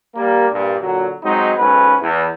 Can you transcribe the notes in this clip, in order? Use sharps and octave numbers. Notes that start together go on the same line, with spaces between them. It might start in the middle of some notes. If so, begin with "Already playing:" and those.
G3 A#3
G2 A#2
A#2 D3 F#3
F#3 G#3 C4 D#4
B1 G#2 C#4 A4 B4
E2